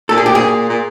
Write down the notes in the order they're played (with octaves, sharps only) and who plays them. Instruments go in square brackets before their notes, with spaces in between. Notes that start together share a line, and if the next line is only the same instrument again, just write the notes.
[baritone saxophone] A#2 [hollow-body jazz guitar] A4
[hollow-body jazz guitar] G#4
G4
G#4
[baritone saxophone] A#2